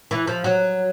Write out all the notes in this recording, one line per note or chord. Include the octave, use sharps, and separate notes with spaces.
E3
F3
F#3